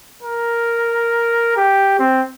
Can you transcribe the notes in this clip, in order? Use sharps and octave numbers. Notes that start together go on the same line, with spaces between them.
A#4
G4
C4